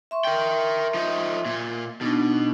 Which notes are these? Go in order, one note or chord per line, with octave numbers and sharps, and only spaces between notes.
E5 C6 C#6
A#4 G5
F3 D#4
A#2
B2 D4 D#4